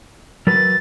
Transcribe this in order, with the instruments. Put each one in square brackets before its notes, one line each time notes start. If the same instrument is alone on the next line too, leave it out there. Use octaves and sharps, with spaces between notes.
[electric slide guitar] F#3 A#4 B4 [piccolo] A6